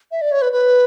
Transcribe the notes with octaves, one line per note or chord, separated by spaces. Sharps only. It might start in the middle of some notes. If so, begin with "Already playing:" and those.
E5
D5
C#5
B4
B4